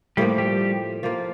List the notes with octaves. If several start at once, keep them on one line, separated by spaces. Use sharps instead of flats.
A2 F3 G3 A#3 G4
G3 G4
F3 A#3 F4